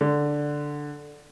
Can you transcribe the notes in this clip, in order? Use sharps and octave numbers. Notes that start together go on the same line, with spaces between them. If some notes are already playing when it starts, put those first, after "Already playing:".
D3